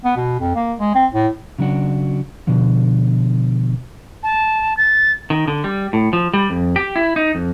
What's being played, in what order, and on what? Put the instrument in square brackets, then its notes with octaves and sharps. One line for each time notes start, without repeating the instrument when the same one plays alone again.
[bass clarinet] B3
B2
F2
A#3
G#3
C4
A2
[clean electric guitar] C#3 F#3 D4 F#4
B2 D3 F3
[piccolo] A5
A6
[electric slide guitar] D#3
D3
G3
A2
F3
G3
F2
G4
E4
D#4
F2